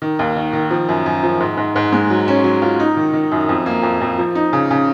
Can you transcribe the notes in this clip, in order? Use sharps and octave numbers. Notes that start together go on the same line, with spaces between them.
D#3
D#2
D#3
D#3
F3
F#2
F#2
F3
G#2
G#2
G#2
G#3
F#3
C#4
F#3
F4
D#4
D#3
D#3
F#2
F2
A#3
F2
F2
F3
D#4
C#3
C#3